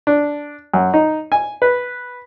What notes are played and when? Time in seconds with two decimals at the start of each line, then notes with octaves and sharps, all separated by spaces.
0.07 D4
0.74 F#2
0.94 D#4
1.32 G#5
1.62 B4